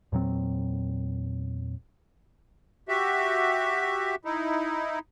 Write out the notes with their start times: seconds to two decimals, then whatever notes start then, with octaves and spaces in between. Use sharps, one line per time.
0.12 E2 A#2 F#3 C4
2.88 F#4 G4 E5
4.25 D#4 E4